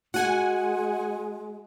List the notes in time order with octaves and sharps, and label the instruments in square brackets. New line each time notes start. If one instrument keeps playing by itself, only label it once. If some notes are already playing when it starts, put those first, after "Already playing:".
[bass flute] G#3 [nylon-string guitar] F#4 [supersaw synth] F#5 G#5